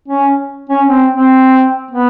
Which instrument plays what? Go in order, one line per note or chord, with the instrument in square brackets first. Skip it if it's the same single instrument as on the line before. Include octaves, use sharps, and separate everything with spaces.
[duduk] C#4
C#4
C4
C4
B3